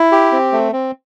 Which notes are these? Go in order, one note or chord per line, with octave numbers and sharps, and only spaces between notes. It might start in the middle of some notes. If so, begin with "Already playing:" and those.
Already playing: E4
G4
C4
A3
C4